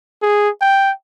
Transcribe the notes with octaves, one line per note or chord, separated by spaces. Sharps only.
G#4
G5